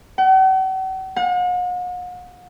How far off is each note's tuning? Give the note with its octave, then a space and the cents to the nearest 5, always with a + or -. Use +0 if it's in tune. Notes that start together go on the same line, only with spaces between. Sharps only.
F#5 +45
F#5 -45